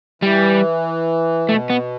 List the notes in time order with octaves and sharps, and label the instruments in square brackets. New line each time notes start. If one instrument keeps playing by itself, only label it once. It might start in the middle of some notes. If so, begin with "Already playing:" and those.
[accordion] E3 [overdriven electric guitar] G3
[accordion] B2 [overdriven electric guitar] A3
[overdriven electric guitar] B3